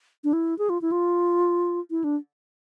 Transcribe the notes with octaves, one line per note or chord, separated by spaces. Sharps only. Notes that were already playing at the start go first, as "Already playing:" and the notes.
D4
E4
G#4
F4
E4
F4
E4
D4